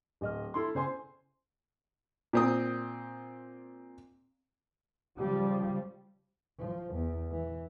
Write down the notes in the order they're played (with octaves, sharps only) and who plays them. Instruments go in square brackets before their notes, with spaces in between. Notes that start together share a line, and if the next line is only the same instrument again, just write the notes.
[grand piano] D1 D#5 F6
E4 A4 C6
C#3 C5 G#5 C6
[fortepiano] A#2 C4 D#6
[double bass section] C#3 F3 G3
[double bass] F3
E2
E3